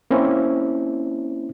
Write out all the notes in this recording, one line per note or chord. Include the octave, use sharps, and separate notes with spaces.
A#3 C4 C#4 E4